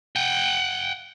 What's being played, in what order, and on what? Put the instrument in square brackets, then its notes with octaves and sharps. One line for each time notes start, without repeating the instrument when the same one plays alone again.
[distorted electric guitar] F#5 G5